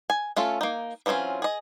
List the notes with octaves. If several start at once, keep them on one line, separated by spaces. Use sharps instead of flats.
G#5
A3 C#4 F4 A4
A#3 D#4
E3 F#3 C4 C#4 F4
G#4 D#5